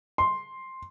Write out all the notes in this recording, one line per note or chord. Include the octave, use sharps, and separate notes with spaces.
C6